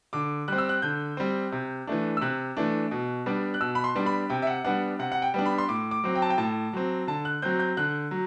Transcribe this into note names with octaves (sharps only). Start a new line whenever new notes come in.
D3 D6
G3 C4 F#6
E6
F#6
D3 G6
G3 C4
C3
E3 A3 D4
E6
C3 F#6
E3 A3 D4
B2
G3 B3 D4
F#6
B2 E6
B5
C6
G3 B3 D4
B5
C3 G5
E5
F#5
G3 B3 D4 F#5
C3 F#5
F#5
G5
G3 B3 D4
B5
C6
A2 D6
D6
F#3 C4
G5
A5
G5
A2 A5
F#3 C4
D3 A5
F#6
F#3 C4 G6
G6
D3 F#6
F#3